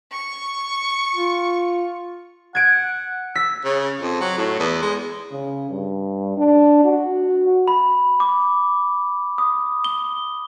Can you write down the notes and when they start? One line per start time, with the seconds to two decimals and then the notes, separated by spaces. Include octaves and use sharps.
0.12 C#6
1.15 F4
2.55 F#5 G#6 D7
3.35 E6 B6
3.64 C#3
4.00 F2
4.21 F#3
4.37 A2
4.59 E2
4.82 G#3
5.32 C#3
5.69 G2
6.37 D4
6.84 F#4
7.68 B5
8.20 D6
9.38 D#6
9.84 G7